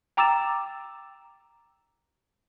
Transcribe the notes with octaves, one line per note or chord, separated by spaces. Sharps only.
G5 A#5 D6 E6 A6 E7